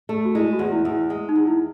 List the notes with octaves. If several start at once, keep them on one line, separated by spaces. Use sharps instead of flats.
A3
F#4
G#3 E4
F#4
E2
E4
E2
E4
G#3
D#4
E2
E4